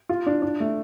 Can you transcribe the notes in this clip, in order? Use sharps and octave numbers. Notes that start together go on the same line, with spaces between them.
F4
D4
D4
A3